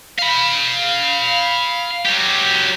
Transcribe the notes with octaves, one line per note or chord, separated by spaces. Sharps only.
F5 B5
F#3 G4